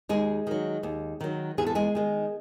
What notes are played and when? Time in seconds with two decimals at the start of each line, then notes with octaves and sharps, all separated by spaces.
0.09 D#2 G#3 G#4
0.47 D#3 F#3
0.83 D#2
1.21 D#3 F#3
1.58 E2 G#4
1.67 A4
1.75 G#3 G#4
1.95 D#3 G#3